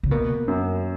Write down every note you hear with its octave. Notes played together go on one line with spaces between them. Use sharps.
C#3
B2 A#3
F#2